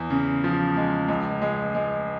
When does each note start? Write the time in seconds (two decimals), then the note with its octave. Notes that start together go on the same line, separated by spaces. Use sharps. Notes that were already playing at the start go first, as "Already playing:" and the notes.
Already playing: E2
0.10 C#3
0.44 F3
0.77 G#3
1.08 C#2
1.42 G#3
1.75 G#3